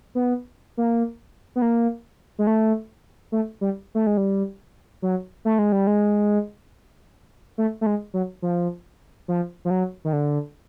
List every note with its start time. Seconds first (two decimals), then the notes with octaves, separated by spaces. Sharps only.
0.15 B3
0.77 A#3
1.56 B3
1.62 A#3
2.39 G#3
2.47 A3
3.32 A3
3.61 G3
3.95 A3
4.07 G#3
4.17 G3
5.02 F#3
5.45 A3
5.59 G#3
5.72 G3
5.87 G#3
7.58 A3
7.81 A3
7.86 G#3
8.14 F#3
8.42 F3
9.28 F3
9.65 F3
9.70 F#3
10.05 D#3
10.13 D3